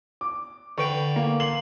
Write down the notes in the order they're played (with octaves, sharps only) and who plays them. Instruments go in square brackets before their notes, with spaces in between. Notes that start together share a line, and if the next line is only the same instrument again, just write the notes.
[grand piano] D6
[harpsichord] D3 B4 G5 [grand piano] C#6
[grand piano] A#3
[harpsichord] C6 [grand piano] F#7